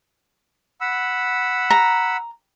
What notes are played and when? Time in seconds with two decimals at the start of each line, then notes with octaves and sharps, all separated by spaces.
0.81 F#5 B5 E6
1.70 A#5